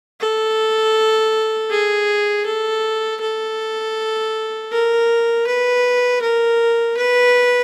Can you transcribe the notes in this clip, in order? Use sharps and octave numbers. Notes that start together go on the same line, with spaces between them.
A4
G#4
A4
A4
A#4
B4
A#4
B4